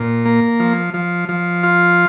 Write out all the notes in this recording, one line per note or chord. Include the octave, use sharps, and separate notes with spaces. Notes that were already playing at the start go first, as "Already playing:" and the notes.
Already playing: A#2
A#3
F3
F3
F3
F4